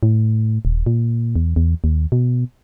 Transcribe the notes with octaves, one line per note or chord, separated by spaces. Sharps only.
A2
D#1
A#2
E2
E2
D#2
B2